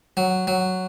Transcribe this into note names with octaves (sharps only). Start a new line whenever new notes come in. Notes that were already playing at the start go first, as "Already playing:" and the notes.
F#3
F#3